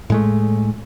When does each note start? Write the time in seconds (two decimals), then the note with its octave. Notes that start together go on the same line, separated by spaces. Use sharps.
0.10 A2 G#3 A3